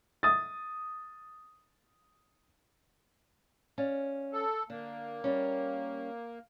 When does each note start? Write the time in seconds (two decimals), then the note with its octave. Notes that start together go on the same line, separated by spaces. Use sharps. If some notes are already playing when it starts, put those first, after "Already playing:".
0.23 D#6 A6
3.78 C#4 D5 F5
4.33 A4
4.70 D3 A#3
5.24 G3 C#4